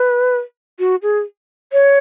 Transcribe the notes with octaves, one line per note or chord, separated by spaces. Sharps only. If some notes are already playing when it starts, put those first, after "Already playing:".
Already playing: B4
F#4
G#4
C#5